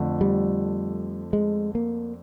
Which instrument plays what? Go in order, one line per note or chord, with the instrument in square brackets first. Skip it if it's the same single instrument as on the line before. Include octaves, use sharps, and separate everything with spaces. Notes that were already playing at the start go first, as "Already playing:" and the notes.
Already playing: [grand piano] F2 D3 F3 A3
[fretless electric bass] G3
G#3
A#3